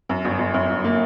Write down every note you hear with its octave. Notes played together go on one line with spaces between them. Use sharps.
F#2
G1
G1
F#2
G1
A#3